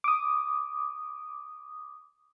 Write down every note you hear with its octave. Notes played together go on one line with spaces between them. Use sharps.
D6 D#6